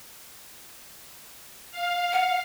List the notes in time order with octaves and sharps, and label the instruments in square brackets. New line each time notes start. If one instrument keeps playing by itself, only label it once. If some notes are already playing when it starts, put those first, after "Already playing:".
[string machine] F5
[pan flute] F#5